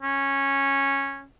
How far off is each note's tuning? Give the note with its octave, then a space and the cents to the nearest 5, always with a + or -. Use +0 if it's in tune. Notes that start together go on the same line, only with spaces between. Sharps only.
C#4 -10